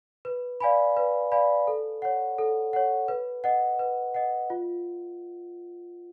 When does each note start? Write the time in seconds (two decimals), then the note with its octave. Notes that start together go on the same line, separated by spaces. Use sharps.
0.25 B4
0.60 D5 F5 G#5 B5
0.97 B4
1.32 D5 F5 G#5 B5
1.67 A4
2.02 C#5 F#5
2.38 A4
2.73 C#5 F#5
3.08 B4
3.44 D#5 F#5
3.79 B4
4.14 D#5 F#5
4.50 F4